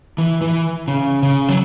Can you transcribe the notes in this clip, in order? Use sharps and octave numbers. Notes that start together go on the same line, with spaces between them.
E3
E3
C#3
C#3
F#3